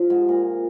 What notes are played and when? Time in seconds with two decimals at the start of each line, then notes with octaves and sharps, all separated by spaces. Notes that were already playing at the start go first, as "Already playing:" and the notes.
Already playing: F3
0.10 G#2
0.29 A#2